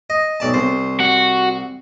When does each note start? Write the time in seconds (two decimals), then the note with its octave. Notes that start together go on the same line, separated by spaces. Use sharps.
0.10 D#5
0.40 B1 D5 A5
0.54 C2 C5
1.00 F#4